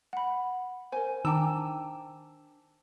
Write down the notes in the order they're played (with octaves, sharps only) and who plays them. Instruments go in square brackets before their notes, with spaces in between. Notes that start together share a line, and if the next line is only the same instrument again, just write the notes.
[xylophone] F#5 B5
[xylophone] A#4 C5 [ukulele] G#5
[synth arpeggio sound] D#3 E6 [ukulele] D4 G5 [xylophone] G#5 A#5 D6